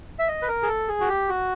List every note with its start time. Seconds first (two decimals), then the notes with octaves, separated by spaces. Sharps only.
0.19 E5
0.28 D#5
0.42 B4
0.48 A#4
0.63 G#4
0.68 A4
0.88 G#4
1.00 F#4
1.09 G4
1.29 F#4